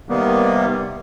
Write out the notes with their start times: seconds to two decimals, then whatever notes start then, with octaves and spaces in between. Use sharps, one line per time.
0.09 C3 D#3 G3 A#3 B3